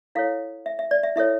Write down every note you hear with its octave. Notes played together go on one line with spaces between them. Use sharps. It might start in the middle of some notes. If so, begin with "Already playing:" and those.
E4 A4 C#5 F5
E5
E5
D5
E5
E4 A4 C#5 E5